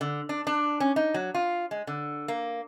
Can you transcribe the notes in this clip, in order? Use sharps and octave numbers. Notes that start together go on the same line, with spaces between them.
D3
D4
D4
C#4
D#4
F#3
F4
G#3
D3
A#3